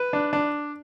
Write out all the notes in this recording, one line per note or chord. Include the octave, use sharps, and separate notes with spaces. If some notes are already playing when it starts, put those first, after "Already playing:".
Already playing: B4
D4
D4